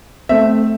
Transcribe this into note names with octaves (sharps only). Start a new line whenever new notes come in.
A3 C4 E5